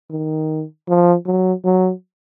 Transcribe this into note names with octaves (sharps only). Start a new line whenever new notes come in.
D#3
F3
F#3
F#3